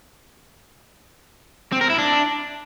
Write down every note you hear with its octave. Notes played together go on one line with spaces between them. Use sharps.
C4
A#4
E4
D4